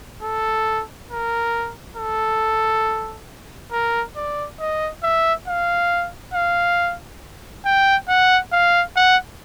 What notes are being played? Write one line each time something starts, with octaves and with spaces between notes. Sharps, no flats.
A4
A#4
A4
A#4
D5
D#5
E5
F5
F5
G5
F#5
F5
F#5